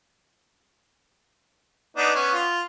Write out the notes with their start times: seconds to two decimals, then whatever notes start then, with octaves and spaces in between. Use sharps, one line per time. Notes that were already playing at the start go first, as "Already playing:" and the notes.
1.97 B3 D4 D#4
2.15 B3 C#4
2.34 F4